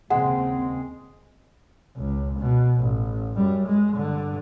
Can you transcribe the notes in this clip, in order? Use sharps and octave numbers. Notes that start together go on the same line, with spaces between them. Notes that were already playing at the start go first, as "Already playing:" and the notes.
D#2 C#3 G#3 C4 F#5
C#2
B2
A1
F#2 G3
G#3
G2 D3